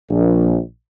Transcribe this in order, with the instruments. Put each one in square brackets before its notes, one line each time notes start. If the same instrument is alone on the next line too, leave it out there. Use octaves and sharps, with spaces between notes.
[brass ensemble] A#1